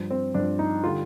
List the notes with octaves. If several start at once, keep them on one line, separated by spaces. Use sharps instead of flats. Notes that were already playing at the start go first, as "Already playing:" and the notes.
Already playing: G2 F3
C4
G2 F3 D4
D#4
D3 G3 F4